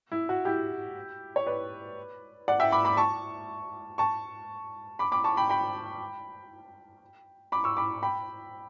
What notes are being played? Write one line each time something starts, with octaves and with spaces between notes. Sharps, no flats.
E4
F#4
E4 G4
C#5
B4 D5
D5 F#5
E5 G5
B5 D6
B5 D6
A5 C#6
A5 C#6
B5 D6
B5 D6
A5 C#6
G5 B5
G5 B5
B5 D6
C#6 E6
B5 D6
G5 B5